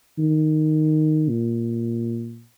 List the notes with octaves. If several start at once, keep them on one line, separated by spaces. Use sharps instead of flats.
D#3
A#2